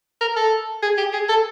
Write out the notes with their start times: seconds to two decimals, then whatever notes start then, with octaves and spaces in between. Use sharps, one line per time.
0.21 A#4
0.36 A4
0.83 G#4
0.98 G4
1.13 G#4
1.29 A4